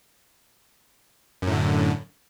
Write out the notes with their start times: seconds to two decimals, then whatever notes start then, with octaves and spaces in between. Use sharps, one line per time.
1.42 F#2
1.47 A2
1.52 D3